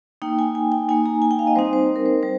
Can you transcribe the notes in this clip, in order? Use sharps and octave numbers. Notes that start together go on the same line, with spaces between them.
A#3 D#4 G5
G#5
G#5
G5
A#3 D#4 G#5
A#5
G#5
G5
F5
D#5
G3 C4 D#4 C5
C5
A#4
C5
G3 C5